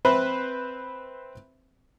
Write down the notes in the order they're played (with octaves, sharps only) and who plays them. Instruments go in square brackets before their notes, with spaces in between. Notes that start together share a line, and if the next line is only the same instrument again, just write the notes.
[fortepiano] C4 B4 C5 E5 B5